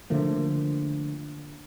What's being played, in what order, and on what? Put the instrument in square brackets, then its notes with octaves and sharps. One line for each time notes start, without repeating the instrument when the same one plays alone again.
[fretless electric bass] D3 F3 A3 A#3